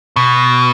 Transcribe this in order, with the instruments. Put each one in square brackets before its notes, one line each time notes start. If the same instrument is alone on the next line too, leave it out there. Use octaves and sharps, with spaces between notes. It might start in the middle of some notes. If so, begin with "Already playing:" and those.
[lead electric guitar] B2